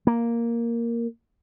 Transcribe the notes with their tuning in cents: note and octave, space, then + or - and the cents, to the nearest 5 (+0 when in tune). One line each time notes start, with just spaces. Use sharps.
A#3 +0